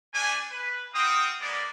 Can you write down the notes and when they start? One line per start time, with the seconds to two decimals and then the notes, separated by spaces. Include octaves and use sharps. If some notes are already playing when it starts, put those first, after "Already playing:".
0.13 A3 D4 G#5
0.51 B4
0.94 C4 F#4 F5 G5 D#6
1.40 G#3 A#3 B3 D5